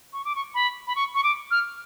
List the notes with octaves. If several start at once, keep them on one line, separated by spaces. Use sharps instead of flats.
C#6
D6
C#6
B5
B5
C#6
C#6
D6
F6